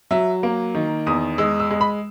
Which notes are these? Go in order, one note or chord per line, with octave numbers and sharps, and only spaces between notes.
F#3 E5
A#3
D#3
E2 D#6
G#3 E6
E6
G#3
B5